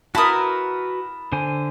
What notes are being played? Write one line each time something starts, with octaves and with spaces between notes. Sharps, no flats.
E4 F#4 A#4 B4 A5 B5 D#6
D3 C5 G#5